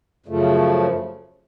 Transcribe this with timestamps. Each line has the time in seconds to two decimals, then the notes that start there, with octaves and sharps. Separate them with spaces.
0.26 F#2 C#3 F3 A3